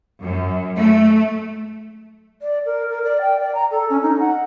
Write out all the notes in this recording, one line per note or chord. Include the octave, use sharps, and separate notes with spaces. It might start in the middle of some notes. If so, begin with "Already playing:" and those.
F#2
A3
D5
A#4
A#4
D5
G5
D5
A#5
A4
C#4
D#4
F#5